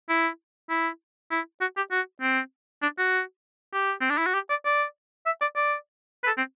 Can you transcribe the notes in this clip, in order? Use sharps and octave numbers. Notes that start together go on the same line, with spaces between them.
E4
E4
E4
F#4
G4
F#4
C4
D4
F#4
G4
C4
D4
E4
F#4
G4
D5
D5
E5
D5
D5
B4
A4
C4